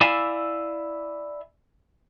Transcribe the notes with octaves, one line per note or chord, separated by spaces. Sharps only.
E4 D5 E5 F5 G#5